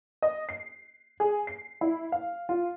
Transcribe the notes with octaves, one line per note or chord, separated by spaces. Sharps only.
D#5
C7
G#4
C7
E4
F5
F4